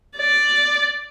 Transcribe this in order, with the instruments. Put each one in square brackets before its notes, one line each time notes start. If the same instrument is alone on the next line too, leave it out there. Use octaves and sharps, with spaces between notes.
[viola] D5